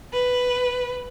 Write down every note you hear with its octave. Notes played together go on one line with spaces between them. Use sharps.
B4